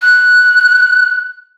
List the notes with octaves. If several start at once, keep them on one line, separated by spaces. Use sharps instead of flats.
F#6